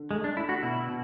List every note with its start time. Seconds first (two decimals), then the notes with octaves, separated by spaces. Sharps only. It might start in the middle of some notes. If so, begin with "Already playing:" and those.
Already playing: D3
0.11 G#3 A3
0.24 D4
0.37 D4 E4
0.49 F#4
0.62 B2 E4
0.88 B2